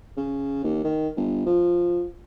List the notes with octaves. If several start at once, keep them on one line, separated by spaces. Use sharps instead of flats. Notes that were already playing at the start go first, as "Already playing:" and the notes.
C#3
D#2
D#3
G1
F3